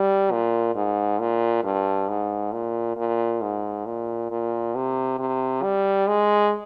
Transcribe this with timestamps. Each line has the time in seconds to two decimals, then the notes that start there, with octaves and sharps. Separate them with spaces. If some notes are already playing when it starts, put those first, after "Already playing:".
Already playing: G3
0.32 A#2
0.75 G#2
1.20 A#2
1.64 G2
2.09 G#2
2.52 A#2
2.97 A#2
3.42 G#2
3.86 A#2
4.31 A#2
4.75 C3
5.19 C3
5.63 G3
6.07 G#3